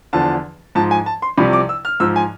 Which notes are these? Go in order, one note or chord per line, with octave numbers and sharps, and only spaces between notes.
E2 D3 F3 A5
G#2 F3 A5
G#5
A5
C6
C2 C3 F3 B5
D6
E6
F6
G#2 F3 E6
G#5